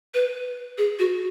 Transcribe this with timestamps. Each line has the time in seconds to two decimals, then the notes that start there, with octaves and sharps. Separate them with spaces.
0.14 B4
0.78 G#4
0.99 F#4